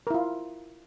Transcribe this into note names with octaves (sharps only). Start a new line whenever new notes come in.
E4 F4 A#4